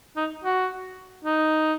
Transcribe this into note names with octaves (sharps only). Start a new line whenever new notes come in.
D#4
F#4
D#4